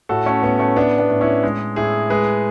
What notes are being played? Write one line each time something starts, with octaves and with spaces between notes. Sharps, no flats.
A2 F#4 A4
A3 C#4
A2 B3
A3 C#4
A2 B3 D4
B3 D4
A2
C#4 E4
G#3
A2 E4 G#4
G#3 G#4 B4